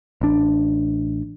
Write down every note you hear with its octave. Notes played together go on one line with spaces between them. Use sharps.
A1 D4